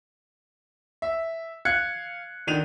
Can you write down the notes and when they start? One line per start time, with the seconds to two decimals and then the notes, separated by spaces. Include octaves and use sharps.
1.02 E5
1.65 F5 F#6 G#6 C#7
2.47 D3 D#3 D#7 F7